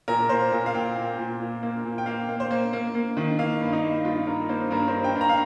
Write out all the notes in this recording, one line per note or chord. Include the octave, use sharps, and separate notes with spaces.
A#2 A#4
A#2 C5
A#2 A#4
F5
A#2 G5
A#3
A#2
A#2
A#3
A#2
G5
A#3 F5
A#3
C5
A#3
A#3
A#3
D#3
A#3 F5
G2
D#4
A#3
G2 F4
G2 A#4
A#3 C5
G2 A#4
C5
G2
G5
G2
A#5
F5